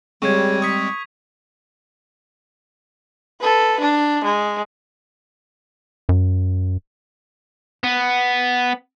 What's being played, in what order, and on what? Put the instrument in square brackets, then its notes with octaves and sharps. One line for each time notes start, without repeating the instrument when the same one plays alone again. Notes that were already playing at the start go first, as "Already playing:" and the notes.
[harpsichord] C#3 [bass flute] G3 [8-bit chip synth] G#3 C4 [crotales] C#6 G#6
[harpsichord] C#6 [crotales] D#6 B6
[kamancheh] A4 B4
D4
G#3
[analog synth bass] F#2
[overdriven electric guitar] B3